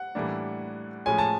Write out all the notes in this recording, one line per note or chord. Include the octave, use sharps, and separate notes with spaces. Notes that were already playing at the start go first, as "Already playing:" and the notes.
Already playing: F#5
A2 E3 G3 A#3 D4
A2 F3 G#3 C#4 G#5
A5